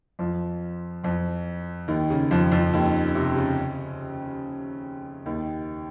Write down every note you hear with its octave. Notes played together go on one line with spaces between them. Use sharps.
F2 F3
F2 F3
D#2 D#3
C#3
F2 F3
F2 F3
D#2 D#3
C3
C#3
D#2 D#3